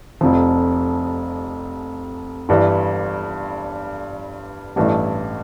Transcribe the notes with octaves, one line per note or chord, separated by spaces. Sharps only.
F1 F2 C3 F3
G1 G2 E3 G3
A1 G2 E3 A3